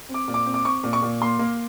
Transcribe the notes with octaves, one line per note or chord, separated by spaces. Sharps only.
C4
D6
A#2
D6
C4
D6
C4 C#6
A#2
C#6
A#2
A#3 C6
A#3